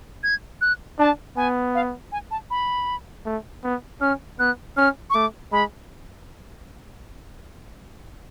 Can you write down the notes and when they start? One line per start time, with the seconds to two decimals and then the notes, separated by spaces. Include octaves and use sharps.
0.23 G#6
0.61 F#6
0.99 D4 A5
1.37 B3 G#5
1.75 F5
2.12 G#5
2.31 A5
2.50 B5
3.25 A3
3.63 B3
4.01 C#4 F6
4.39 B3 F#6
4.77 C#4 F6
5.10 C#6
5.14 A3 D6
5.52 G#3 B5